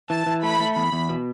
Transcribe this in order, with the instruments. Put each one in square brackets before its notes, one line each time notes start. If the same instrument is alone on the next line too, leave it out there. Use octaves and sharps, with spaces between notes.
[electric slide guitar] E3 [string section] A5
[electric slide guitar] E3
[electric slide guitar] A3 [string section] B5
[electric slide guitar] A3
[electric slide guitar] E2 [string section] B5
[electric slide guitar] E2
B2